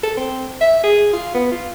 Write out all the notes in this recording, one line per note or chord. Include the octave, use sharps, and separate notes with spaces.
A4
C4
E5
G#4
F4
B3
F4